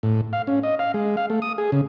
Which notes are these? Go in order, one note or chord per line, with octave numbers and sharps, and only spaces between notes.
A2
F5
C#4
D#5
F5
G#3
F5
A3
D#6
G#4
C#3